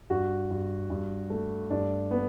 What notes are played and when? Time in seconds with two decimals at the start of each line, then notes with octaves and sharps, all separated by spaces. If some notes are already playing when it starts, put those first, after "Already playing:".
0.10 G2 F#4
0.50 G2
0.90 G2
1.30 A3
1.70 G2 D4
2.11 B3